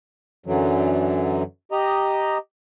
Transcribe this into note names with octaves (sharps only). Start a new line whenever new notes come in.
F#2 D3 E3 F#3
G4 D#5 A#5